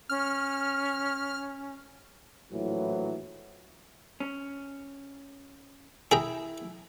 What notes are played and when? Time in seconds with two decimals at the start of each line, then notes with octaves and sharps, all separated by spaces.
0.09 C#4 F6
2.52 A#1 A2 E3 F#3
4.20 C#4
6.12 E4 G#4 G5 A#5